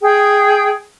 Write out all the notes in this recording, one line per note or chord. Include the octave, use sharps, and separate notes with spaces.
G#4 G5